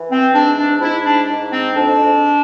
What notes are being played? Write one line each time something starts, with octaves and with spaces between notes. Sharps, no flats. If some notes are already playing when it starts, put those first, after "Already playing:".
Already playing: E3
C4
G#2 D4
D4
G#2 E4
D4
G#2
C4
F2 D4